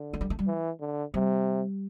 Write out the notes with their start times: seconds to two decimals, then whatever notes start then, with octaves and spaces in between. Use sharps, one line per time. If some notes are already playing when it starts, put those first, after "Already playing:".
Already playing: D3
0.13 A3
0.21 G3
0.30 A3
0.39 G3
0.47 E3
0.80 D3
1.14 C3 G3